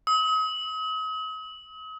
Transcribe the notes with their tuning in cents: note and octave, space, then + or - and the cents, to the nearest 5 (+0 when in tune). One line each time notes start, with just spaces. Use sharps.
D#6 +40